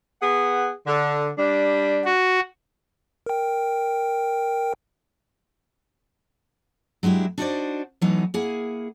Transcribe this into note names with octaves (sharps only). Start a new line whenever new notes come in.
B3 G#4 F#5
D3
G3 D4
F#4
A#4 G5
F#3 G#3 D4 E4 G4
D4 D#4 F#4 A4 C5 D5
E3 F#3 A3 B3 D#4
A#3 E4 G#4 F#5